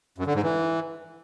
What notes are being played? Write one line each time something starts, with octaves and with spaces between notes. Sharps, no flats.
F#2
D3
G#2
E3